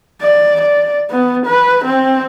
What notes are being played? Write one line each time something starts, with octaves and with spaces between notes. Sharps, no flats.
D5
D5
B3
B4
C4